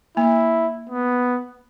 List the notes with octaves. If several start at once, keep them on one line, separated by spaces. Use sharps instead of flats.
A#3 E4
B3